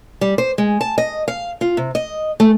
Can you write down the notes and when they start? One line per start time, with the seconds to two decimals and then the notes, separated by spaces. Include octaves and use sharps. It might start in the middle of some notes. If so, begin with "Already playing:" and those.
0.21 G3
0.38 C5
0.58 G#3
0.81 A5
0.98 D#5
1.28 F5
1.61 F4
1.77 C3
1.95 D#5
2.40 A3